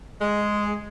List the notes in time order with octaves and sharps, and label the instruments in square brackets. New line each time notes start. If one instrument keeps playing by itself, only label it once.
[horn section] G#3